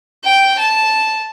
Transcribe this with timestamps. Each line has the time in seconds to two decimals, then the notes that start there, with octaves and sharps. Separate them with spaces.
0.24 G5
0.58 A5